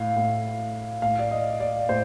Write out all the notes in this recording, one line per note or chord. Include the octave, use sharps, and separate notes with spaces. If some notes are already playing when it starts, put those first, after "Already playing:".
Already playing: A2 F5
A2
A2 F5
D5
D#5
D5
A2 C5